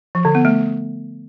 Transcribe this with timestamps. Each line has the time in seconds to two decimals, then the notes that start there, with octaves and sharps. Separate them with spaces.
0.15 F3
0.25 D3
0.35 B3
0.45 A3